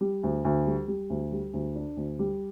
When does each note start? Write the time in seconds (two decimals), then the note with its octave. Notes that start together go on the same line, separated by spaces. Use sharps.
0.01 G3
0.23 D2
0.45 D2
0.67 G3
0.88 G3
1.10 D2
1.32 G3
1.54 D2
1.75 D4
1.97 D2
2.19 G3